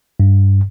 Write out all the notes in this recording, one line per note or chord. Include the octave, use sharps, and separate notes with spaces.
G2